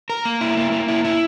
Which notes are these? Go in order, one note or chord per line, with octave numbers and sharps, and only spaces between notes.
A#4
A#3
E4
A#3
A#3
E4
E4